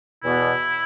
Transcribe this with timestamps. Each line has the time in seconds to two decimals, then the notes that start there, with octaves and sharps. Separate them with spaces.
0.23 E2 B2 B3 E4